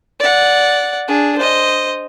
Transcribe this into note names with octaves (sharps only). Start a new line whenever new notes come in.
D5 F#5
D4 G#4
C5 D#5